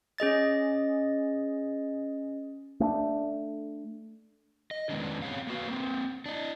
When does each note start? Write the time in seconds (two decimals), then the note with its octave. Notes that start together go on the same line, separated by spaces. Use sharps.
0.18 C#4 G#4 D#5 A6
2.80 A3 C#4 D4
4.71 D#5
4.90 D#3 G#3 B3 C#4 D4
5.22 B3 C4 C#5 F5
5.47 A#3 B3 F#4 F5
5.66 A#3 C4
6.26 D4 D#5